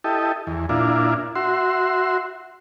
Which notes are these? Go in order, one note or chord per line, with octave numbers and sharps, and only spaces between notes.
E4 G4 A4 D#5
E2
A#2 D4 E4 F4
F#4 E5 C6